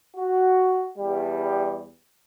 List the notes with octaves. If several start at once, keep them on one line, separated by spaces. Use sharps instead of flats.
F#4
E2 G3